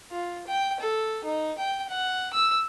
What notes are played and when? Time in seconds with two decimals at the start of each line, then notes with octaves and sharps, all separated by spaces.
0.11 F4
0.47 G5
0.80 A4
1.24 D#4
1.58 G5
1.89 F#5
2.33 E6